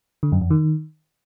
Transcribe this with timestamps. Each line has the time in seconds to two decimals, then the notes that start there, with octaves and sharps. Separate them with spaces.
0.23 D3
0.32 F#2
0.41 F2
0.51 D#3